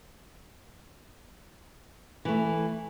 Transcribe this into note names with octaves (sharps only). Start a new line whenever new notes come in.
E3 A3